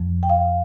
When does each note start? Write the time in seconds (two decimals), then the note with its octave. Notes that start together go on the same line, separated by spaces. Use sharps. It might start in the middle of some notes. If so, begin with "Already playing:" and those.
Already playing: F2 F3
0.23 G5
0.29 F5